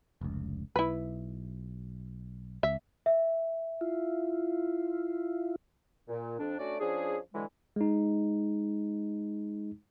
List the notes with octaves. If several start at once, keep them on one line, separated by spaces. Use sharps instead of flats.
F1 C#2
B1 E4 B4
C#2 E5
E5
E4 F4
A#2
F2 D4
A3 C#4 D4 F#4 D5
F3 C#4 D4 G#4
D3 E3 F#3 G#3
G#3 D#4